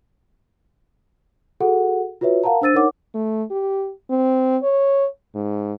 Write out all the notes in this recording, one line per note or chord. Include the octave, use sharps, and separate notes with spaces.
F#4 G#4 A4 F#5
F4 F#4 B4 C#5 E5
A#4 F5 F#5 A5 A#5
D4 C5 E6 A6 D#7
D#4 A#4 C#5 F#5 D6
A3
G4
C4
C#5
G#2